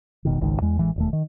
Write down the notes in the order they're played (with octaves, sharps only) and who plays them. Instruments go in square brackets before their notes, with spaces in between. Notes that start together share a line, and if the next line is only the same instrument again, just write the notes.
[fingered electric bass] E1 B2 D#3
G#1 C#2 G#2 D#3
E2 G#3
A1 E3 G#3
E1 D#2 A3
D#3